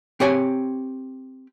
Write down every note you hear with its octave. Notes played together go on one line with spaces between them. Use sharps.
C4 G4 C#5 G#5